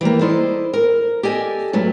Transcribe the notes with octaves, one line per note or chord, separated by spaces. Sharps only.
E3 G3 A#3
E4 A4 C5 D5 D#5
A#4
G4 A4 D5 D#5 G#5
G2 F#3 A3 B4